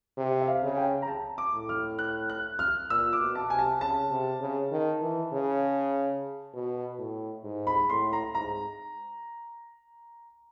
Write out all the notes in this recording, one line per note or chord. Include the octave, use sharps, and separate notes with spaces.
C3
E5
F5
C#3
G5
A#5
A5
D6
A2
F6
F#6
F#6
F6
A#2 E6
D6
B2
A5
C3 G#5
A5
C#3 A5
C3
C#3
D#3
E3
C#3
B2
A2
G#2
B5
A2 C6
A#5
G#2 A#5